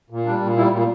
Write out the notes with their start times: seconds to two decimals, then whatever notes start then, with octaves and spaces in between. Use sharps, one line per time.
0.10 A#2
0.25 G3 D4
0.41 A#2
0.56 G3 E4
0.73 A#2 G3